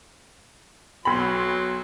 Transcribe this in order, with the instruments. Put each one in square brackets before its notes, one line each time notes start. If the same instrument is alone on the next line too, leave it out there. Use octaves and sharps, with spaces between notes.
[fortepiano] B1 B5 [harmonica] F#3 C6